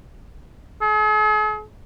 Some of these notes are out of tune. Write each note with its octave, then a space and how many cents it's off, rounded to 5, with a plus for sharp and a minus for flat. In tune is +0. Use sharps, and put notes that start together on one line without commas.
G#4 +45